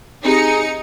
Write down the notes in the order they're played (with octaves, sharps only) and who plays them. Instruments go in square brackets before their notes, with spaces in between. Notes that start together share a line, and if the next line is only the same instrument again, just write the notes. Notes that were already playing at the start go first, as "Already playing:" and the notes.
[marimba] C4 G4 [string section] D#4 C#7 [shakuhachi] G#4